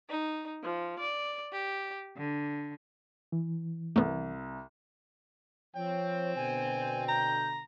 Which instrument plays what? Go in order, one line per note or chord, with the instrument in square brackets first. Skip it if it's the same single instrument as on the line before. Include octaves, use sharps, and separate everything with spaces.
[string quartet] D#4
F3
D5
G4
D3
[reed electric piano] E3
[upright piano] C2 [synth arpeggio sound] A3 B3
[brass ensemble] F3 C#5 [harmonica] C4 G5
[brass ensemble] B2 D3 [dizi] G#5
[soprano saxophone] A#5 [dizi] G6